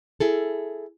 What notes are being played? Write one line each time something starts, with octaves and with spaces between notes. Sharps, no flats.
E4 G#4 A4